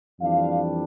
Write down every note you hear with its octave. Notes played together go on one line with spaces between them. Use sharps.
F2 E3 G3 D4 F5